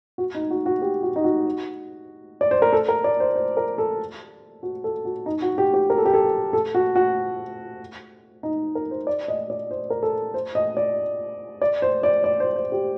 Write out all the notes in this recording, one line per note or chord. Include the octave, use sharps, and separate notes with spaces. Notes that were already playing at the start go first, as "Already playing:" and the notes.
F#4
D#4
F#4
F#4
G4
F#4
D#4
F#4
D5
C5
A#4
A4
A#4
D5
C5
C5
A#4
A4
F#4
A4
F#4
D#4
F#4
G4
G4
A#4
A4
G4
A4
A4
F#4
F#4
D#4
A#4
C5
D5
D#5
D5
C5
A#4
A4
C5
D#5
D5
D5
C5
D5
D5
C5
C5
G4